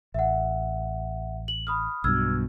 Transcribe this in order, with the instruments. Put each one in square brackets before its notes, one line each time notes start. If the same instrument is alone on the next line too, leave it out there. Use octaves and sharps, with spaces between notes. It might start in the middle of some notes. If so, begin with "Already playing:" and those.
[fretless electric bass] A1 [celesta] E5 F#5
[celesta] F#7
B5 D#6 F6
[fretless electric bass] B1 G2 B2 [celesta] E6 F6 G#6